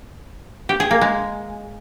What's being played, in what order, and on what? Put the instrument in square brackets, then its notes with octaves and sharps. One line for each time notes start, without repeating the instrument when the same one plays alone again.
[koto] G4
G#4
A#3
G#3